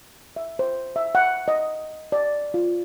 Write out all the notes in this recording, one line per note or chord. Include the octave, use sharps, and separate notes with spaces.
E5
C5
E5
F#5
D#5
D5
F4